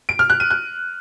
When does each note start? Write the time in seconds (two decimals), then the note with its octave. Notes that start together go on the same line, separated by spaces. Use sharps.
0.09 D7
0.19 F6
0.30 F#6
0.40 D#7
0.50 F#6